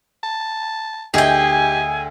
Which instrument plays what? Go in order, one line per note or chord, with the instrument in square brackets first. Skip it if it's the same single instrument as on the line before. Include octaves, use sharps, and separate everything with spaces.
[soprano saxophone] A5
[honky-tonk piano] D2 D#5 E5 [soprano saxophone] G4 [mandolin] G#4 G5 [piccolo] G#5